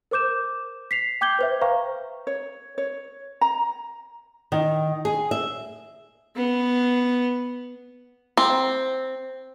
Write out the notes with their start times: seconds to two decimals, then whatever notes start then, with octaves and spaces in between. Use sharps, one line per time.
0.11 A#4 C5 D6 G6 E7
0.91 B6 C7 F7
1.21 G5 D6 G6 G#6 G7
1.39 B4 C5 E5
1.61 B4 C5 F5 G5 A#5 C#6
2.27 C#5
2.78 C#5
3.41 A#5
4.52 D#3
5.05 G#4
5.31 E5
6.36 B3
8.37 C4